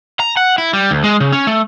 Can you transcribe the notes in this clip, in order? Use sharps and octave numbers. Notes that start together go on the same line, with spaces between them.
A#5
F#5
E4
G3
D2
G#3
C#3
C#4
A3